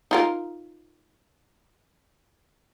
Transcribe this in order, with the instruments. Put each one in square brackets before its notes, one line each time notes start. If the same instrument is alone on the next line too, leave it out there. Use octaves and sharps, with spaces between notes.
[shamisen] D#4 F4 A#4